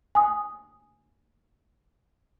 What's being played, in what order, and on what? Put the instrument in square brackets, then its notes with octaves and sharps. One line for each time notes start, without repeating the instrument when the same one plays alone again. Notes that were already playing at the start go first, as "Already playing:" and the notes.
[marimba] G#5 D#6